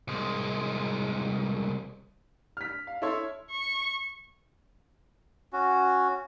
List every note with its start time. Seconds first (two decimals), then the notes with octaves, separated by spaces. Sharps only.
0.08 C2 G#3
2.57 F6 B6
2.87 F5
3.02 E4 A4 C#5 E5 C6
3.51 C#6
5.53 C#4 F#4